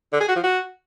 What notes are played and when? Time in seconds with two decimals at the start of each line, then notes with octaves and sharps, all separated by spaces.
0.13 D3
0.21 G#4
0.28 F#4
0.36 F3
0.44 F#4